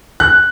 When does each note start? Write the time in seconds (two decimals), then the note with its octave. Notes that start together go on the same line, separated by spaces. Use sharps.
0.20 F#6